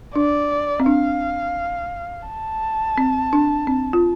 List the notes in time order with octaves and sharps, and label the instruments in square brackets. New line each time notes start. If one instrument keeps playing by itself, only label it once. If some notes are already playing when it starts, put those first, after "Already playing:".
[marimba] D4 [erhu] D5
[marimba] C4
[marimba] D4 [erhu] F5
[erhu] A5
[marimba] C4
D4
C4
F4